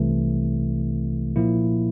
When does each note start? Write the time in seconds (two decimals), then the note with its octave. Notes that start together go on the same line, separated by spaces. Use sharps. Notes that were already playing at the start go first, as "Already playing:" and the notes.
Already playing: C2 C3 E3 A3
1.36 A#2 F3 A#3 E4